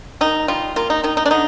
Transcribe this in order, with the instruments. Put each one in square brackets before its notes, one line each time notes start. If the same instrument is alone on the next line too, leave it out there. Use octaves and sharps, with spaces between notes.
[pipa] D#3 D#4
G3 F4
A#3 F4
D#4
D#3 D#4
D#4
D4
D3 D#4